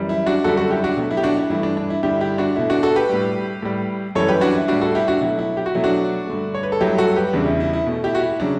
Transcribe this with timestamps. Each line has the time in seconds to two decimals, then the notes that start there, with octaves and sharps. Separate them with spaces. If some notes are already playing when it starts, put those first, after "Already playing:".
Already playing: F#2 E3 G3
0.09 E4
0.26 D4 F#4
0.44 F#2 D3 G3 F#4 A4
0.57 F#4 A4
0.70 E4 G4
0.84 D4 F#4
0.97 B2 F#3 A3
1.11 E4
1.17 G4
1.23 D4 F#4
1.37 E4
1.50 G2 E3 A3 E4
1.63 D4
1.77 D4
1.90 E4
2.03 G2 D3 G3 E4 G4
2.21 E4 G4
2.38 D4 F#4
2.56 B2 A3 E4
2.70 D4 F#4
2.83 F#4 A4
2.96 G4 B4
3.09 A2 G3
3.63 A2 G3
4.15 F#2 E3 G3 A4 C#5
4.28 G4 B4
4.41 D4 F#4
4.55 E4
4.68 A2 G3 D4 F#4
4.81 F#4 A4
4.95 E4 G4
5.08 D4 F#4
5.21 B2 F#3 A3 E4
5.39 E4
5.57 G4
5.66 F#4
5.75 B2 F#3 A3 E4
5.84 D4 F#4
6.27 G2 D3 A3
6.54 C#5
6.63 B4
6.72 A4
6.80 G2 F#3 A3 E4 G4
6.98 F#4 A4
7.16 G4 B4
7.33 E2 C#3 E3 G3 D4
7.46 E4
7.60 E4
7.73 E4
7.86 B2 A3
8.04 E4 G4
8.15 F#4
8.22 E4
8.40 C#3 F#3 D4